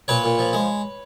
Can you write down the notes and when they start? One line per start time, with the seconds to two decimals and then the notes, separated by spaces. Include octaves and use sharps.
0.08 A#2 B4 C#5
0.24 A#2
0.39 F3
0.53 G#3